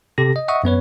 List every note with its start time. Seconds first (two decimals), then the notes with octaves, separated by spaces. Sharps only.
0.18 C3 G4 A4 A#6
0.36 D#5
0.48 D#5 E5 F#5 C#6 D#6
0.64 F#2 B3 B4 C#5